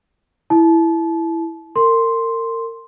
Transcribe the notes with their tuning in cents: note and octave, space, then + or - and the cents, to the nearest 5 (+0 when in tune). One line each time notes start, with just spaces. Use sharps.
E4 +5 A5 -30
A#4 -35 C6 +0